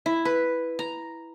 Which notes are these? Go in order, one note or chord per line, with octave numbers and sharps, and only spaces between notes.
E4
B4
A#5